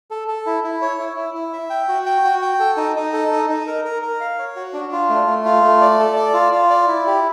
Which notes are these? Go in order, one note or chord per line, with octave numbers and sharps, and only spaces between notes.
A4
A4
E4
E4
C#5
E4
E4
E4
E5
G5
F#4
G5
F#4
G5
A4
D#4
D#4
A4
D#4
D#4
A#4
A#4
A#4
F5
C#5
F#4
D4
F4
A3
A3
F4
A3
D5
A4
D5
F4
F4
D5
E4
G4